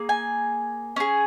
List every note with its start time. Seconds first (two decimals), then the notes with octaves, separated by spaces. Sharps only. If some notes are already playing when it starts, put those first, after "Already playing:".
Already playing: A#3 G#4
0.09 G#5
0.96 C#4 G#4